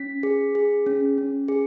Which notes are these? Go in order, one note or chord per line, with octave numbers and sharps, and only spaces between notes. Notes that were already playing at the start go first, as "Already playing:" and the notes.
Already playing: C#4 B6
G#4
G#4
C#4
C#4
G#4